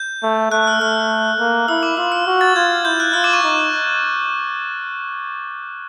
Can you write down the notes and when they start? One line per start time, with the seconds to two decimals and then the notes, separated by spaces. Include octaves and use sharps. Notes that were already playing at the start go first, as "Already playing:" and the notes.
Already playing: G6
0.23 A3
0.52 A3 F#6
0.67 F6
0.81 A3 F6
1.39 A#3
1.68 E4 E6
1.83 D6
1.97 F4 E6
2.12 F6
2.27 F#4
2.41 A6
2.56 F4 G#6
2.85 E4 G6
3.00 F#6
3.13 F4 F6
3.24 D6
3.33 C#6
3.43 D#4